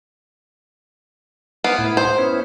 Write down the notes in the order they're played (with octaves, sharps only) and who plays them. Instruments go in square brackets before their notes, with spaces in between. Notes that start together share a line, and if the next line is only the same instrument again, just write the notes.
[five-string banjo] B3 [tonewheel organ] C5 F5 D6
[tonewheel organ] A2 E4
[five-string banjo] C5
[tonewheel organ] B3 C#4 E4